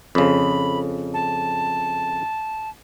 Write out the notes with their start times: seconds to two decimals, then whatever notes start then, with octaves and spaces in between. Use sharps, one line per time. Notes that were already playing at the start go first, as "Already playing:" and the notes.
0.15 F2 C#3 B5
1.14 A5